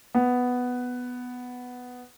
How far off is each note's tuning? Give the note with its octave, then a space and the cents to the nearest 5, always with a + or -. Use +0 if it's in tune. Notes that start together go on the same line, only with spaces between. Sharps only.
B3 +5